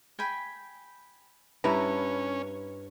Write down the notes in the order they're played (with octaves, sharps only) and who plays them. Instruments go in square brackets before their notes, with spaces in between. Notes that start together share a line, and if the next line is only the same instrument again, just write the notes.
[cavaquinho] G5 G#5 B5
[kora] G2 E4 [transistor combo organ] C#4 [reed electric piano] B4 [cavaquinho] A#5